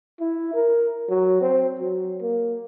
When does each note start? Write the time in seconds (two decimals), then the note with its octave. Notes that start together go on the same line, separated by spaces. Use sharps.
0.20 E4
0.54 A#4
1.09 F#3
1.42 C4
1.80 F#3
2.22 A#3